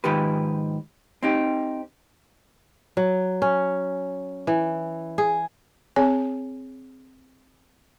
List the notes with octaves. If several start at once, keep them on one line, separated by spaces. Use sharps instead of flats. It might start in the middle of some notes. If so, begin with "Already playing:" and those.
G#2 D#3 F3 G4 B4
C4 D#4 G4
F#3
C#4
E3
G#4
C4 G#4 C#5 G#5